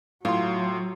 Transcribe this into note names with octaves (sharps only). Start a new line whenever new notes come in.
A2 F#3 F4 C6